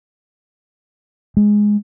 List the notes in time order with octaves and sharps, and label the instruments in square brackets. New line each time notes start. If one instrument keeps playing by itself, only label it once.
[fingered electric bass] G#3